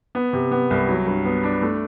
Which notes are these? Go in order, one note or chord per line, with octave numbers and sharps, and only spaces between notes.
B3
C3
B3
C2
F#3
G2
B3
D4
A3